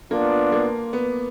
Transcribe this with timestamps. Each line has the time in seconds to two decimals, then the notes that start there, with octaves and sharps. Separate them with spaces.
0.10 A#3 B3 D4 F4
0.52 A#3
0.93 B3